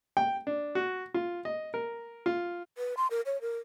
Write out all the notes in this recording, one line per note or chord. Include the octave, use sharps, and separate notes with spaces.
G5
D4
F#4
F4
D#5
A#4
F4
B4
C6
A#4
C#5
A#4